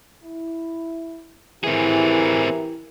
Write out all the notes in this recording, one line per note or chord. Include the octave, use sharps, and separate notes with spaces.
E4
E3 C4 E4 G4 G#4 A#4